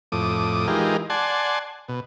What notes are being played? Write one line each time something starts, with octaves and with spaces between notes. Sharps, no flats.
F2 A2 D6 D#6
E3 G#3 D#4 F4 G4 A#4
D5 F#5 G#5 A5 C6
B2